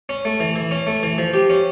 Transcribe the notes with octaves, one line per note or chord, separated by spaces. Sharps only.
C#4
A3
E3
E3
C#4
A3
E3
F3
G4
C#4